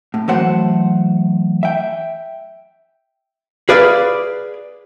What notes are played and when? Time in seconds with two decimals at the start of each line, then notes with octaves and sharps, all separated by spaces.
0.14 A2
0.28 E3 F#3 A3 C5 F#5 G5
1.63 E5 G5
3.69 G#4 B4 D5 F5